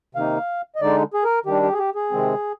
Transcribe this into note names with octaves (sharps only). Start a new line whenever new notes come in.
C3 D#3 A#3 D#4 F5
D#5
D3 G#3 D#4 D5
G#4
A#4
D#3 G3 D4 G4
G4
G#4
G4
G#4
C3 D#3 G#3 C4